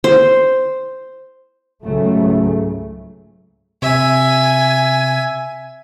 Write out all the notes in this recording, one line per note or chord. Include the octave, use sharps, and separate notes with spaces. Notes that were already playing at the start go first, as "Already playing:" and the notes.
C5
C#2 G#2 C#3 F#3 A3
C3 E5 G#5